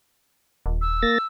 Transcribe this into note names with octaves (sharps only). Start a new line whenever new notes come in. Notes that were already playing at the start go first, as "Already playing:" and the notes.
D#1
E6
A#3 A6 A#6